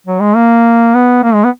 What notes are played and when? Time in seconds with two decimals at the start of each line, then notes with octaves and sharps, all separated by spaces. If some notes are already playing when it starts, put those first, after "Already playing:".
0.06 F#3
0.20 G#3
0.35 A#3
0.95 B3
1.24 A#3
1.34 G#3
1.44 B3